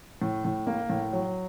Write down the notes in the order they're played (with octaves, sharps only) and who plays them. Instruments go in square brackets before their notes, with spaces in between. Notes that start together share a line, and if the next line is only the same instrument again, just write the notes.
[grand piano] A2
A2
A#3
A2
F#3